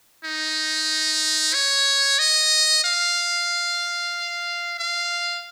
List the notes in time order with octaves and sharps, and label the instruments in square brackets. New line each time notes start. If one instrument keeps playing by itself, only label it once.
[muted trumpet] D#4
C#5
D#5
F5
F5